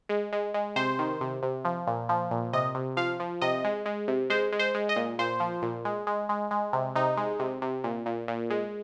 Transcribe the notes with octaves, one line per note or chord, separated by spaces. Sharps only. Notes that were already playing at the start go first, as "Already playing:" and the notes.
G#3
G#3
G#3
C3 C5
D#3
C3
C3
F3
A#2
F3
A#2
C3 D#5
C3
F3 F5
F3
C3 D#5
G#3
G#3
C3
G#3 C5
G#3
C5
G#3
D#5
A#2
A#2 C5
F3
A#2
G#3
G#3
G#3
G#3
C3
C3 D#4
G#3
C3
C3
A#2
A#2
A#2
G#3